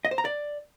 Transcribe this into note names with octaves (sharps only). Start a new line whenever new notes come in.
D#5
C5
A#5
D5